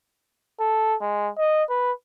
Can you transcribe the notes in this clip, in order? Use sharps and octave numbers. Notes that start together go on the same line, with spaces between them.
A4
G#3
D#5
B4